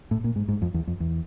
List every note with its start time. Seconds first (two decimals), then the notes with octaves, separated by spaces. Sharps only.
0.11 A2
0.24 A#2
0.36 G#2
0.48 G#2
0.62 F2
0.74 E2
0.87 F2
1.00 E2